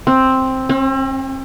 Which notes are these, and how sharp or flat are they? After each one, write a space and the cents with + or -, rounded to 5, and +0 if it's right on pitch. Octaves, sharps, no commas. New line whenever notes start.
C4 +5
C4 +45